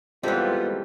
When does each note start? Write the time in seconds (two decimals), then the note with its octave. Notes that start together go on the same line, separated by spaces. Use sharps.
0.23 E3 G3 G#3 B3 C4 F4 A4